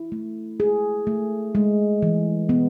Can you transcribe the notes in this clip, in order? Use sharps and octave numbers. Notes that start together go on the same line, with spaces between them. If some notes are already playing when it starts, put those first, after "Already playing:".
Already playing: E4
A3
G#4
A3
G#3
E3
B3